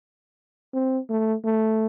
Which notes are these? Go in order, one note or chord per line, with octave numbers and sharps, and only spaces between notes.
C4
A3
A3